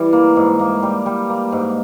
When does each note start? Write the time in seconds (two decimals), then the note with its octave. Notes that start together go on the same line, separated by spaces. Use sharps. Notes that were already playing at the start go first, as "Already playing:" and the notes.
Already playing: E3 G3
0.13 A#3
0.36 G#2
0.59 A#3
0.83 G3
1.06 G3
1.29 A#3
1.52 G#2